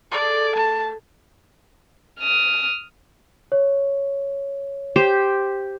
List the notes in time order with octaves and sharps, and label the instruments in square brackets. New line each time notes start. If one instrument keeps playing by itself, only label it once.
[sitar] G#4 A4 [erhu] D5
[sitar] A3 [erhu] A5
[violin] D#6 F6
[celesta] C#5
[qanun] G4 C5